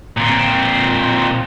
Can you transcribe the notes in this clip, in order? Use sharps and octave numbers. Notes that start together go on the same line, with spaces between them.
A#2 C4